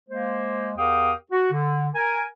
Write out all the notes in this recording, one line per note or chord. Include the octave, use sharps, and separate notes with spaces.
G#3 A#3 C5
E2 G4 A#4 F5 G5 D#6
F#4
D3
A#4 G#5